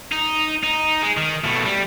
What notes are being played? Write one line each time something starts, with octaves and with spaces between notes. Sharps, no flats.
D#4
D#4
G#3
D#3
B2 A3
G3